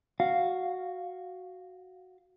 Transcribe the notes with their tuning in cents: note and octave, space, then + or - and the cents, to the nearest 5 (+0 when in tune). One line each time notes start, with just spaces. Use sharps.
F#4 +0 F5 +0